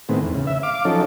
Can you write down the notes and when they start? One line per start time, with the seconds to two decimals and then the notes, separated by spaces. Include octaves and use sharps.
0.09 A2 D#3 G#3 B3 C4
0.23 E2
0.34 C#3
0.47 E5
0.63 F5 D6
0.85 F3 F#3 C#4 D#4 A4